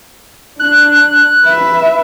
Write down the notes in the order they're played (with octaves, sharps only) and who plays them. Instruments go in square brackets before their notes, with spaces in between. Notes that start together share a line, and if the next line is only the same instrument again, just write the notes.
[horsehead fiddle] D4 [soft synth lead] F#6
[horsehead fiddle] B4 E5